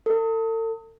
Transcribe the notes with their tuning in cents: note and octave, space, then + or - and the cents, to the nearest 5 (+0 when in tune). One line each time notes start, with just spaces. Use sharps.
A4 +40